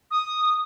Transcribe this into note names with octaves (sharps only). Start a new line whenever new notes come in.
D#6